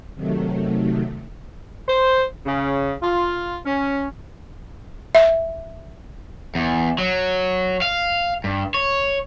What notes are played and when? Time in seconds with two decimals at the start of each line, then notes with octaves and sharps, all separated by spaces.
0.15 C3 D#3 F#3 A3
1.88 C5
2.46 C#3
3.02 F4
3.66 C#4
5.15 E5
6.55 E2
6.98 F#3
7.82 F5
8.44 G2
8.74 C#5